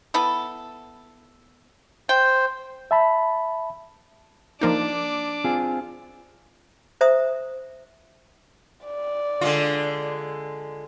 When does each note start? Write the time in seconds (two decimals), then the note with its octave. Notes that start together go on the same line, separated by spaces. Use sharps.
0.14 B3 E4 A4
2.09 C5 G5
2.91 E5 A5 B5
4.61 F3 A#3 D4 D#4 D6
5.44 C4 F4 G#4
7.01 C5 E5 A#5 D#6
8.86 D5
9.41 D3 G#3 F4